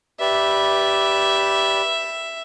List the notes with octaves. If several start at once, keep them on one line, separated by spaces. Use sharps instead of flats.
G4 B4 D5 E5